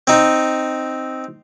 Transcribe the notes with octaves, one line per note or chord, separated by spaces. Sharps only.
C4 D#4